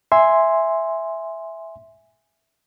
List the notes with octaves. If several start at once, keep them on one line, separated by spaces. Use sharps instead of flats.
E5 G#5 C6